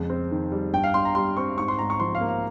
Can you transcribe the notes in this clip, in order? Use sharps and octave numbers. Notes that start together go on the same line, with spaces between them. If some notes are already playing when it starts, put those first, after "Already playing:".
Already playing: F2 C#3 G#3
C4
D#3
G3
G2 G5
F5
G2 C6
A#5
G3 C6
C4 C#6
G#2 C#6
C6
G#2 A#5
C#6
F3 C6
F5
A#3
F5